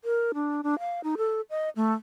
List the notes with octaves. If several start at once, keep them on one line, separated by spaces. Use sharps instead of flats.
A#4
D4
D4
F5
D#4
A4
D#5
A3